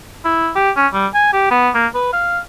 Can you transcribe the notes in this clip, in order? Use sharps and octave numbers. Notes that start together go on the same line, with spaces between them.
E4
G4
C#4
G3
G#5
G4
B3
A#3
B4
F5